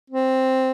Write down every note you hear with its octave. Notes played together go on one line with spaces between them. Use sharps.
C4